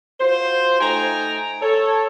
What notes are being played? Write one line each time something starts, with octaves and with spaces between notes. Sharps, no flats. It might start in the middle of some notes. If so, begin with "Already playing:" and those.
F4 F#4 C5
A3 D#4 G5 G#5 A#5
A4 C#5